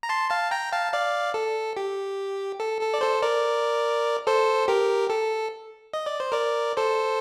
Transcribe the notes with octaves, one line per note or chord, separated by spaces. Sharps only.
A#5
A5 C6
F5 A5
G5 A#5
F5 A5
D5 F5
A4
G4
A4
A4
D5
A4 C5
A#4 D5
A4 C5
G4 A#4
A4
D#5
D5
C5
A#4 D5
A4 C5